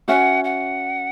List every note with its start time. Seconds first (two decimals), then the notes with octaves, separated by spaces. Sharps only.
0.08 C#4 F#4 E5 F#5
0.44 F#5